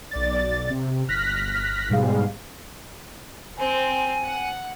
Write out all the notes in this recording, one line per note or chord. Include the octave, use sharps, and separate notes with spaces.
B1 D5 A6
C3
G1 F6 F#6 A#6 B6
G#2 B2 G3 G#3 F5
C4 G#5
F#5